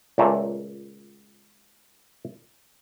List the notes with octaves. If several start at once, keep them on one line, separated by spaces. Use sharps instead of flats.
C#2 A#2 A3